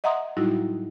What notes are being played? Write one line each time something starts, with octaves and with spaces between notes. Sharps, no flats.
D#5 E5 F#5 A#5 C6 D#6
A2 F#3 G3 D#4 E4 F#4